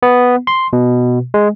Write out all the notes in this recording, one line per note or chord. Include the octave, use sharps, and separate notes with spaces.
B3
C6
B2
G#3